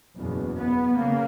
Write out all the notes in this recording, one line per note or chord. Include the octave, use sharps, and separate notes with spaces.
F#1 E2 B2
B3
C#3 A#3